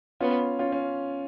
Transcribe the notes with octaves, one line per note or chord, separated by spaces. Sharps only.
B3 C#4 F4
C#4 F4
C#4